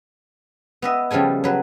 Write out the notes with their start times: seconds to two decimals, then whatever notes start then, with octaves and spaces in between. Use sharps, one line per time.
0.82 B3 D#5 E5
1.11 C#3 F3 G3 A3 G#5
1.44 F#3 B4